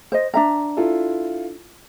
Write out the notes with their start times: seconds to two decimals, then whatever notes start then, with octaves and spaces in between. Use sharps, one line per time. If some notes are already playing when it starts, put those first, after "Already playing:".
0.12 C5 D#5
0.34 D4 E5 A#5
0.77 E4 F4 A4